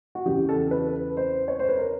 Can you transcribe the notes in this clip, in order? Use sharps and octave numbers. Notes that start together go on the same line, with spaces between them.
F#4
E2 C#3 E3 G4
A4
B4
C5
C#5
C5
B4
A#4